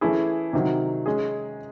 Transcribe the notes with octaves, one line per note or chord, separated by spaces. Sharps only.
E3 A3 C#4 E4 G#4
C3 D#3 F#3
G#3 C#4 G#4